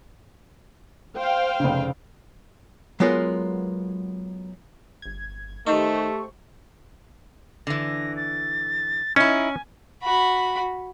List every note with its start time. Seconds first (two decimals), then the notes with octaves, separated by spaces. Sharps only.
1.17 C5 F5 G5
1.60 F1 C#3
3.00 F#3 G#3 B3 F4 A#4 B4
5.02 G1 G#6
5.67 D#3 A3 D#4 G4 C5 C#6
7.67 D3 E3 A#6
8.16 A6
9.16 C#4 D#4 E4 G#5
10.03 F#4 B5